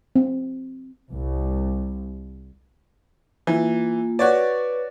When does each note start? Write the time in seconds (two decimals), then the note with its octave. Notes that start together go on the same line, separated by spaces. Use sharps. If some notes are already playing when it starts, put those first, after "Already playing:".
0.16 C4
1.12 C2
3.47 E3 A#3 F4
4.19 F#4 B4 C#5 D5